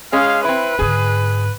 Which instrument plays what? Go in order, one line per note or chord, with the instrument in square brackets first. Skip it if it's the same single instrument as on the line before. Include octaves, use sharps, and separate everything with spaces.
[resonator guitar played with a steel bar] G#3 C#4 G#4 [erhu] F5
[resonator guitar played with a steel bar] C4 E4 [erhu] B4
[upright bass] G#2 D3 [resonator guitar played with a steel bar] G#4